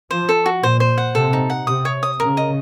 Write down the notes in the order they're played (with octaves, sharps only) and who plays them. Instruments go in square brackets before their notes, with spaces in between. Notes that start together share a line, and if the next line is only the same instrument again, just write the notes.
[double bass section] F3 [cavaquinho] C5
[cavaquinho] A4
F#4
[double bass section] A#2 [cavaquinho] C5
[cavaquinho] C5
F#5
[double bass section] C3 [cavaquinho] A4
[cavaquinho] D#4
F#5
[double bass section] C3 [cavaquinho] D#6
[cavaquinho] C#5
D#6
[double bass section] C#3 [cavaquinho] A#4
[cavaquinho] D#5